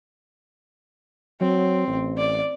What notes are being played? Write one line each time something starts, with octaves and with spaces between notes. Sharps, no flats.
F#3 C4
A1
D5